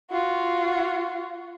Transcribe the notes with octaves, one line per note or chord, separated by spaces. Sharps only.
F4 F#4